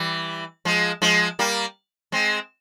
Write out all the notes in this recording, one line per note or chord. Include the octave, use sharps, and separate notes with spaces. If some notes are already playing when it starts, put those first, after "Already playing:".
Already playing: E3 G3
F3 G#3
F3 G#3
G3 A#3
G#3 C4